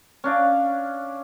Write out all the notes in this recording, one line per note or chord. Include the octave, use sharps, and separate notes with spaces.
C#4 D4 F5